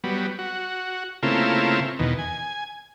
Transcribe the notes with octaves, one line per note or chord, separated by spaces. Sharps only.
F#3 G3 B3
F#4
C#3 A3 A#3 C4 E4 F4
E2 B2 D#3
G#5